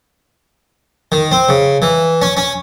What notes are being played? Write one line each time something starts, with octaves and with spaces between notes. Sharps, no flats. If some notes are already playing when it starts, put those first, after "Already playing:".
D#3
C4
C#3
E3
C#4
C#4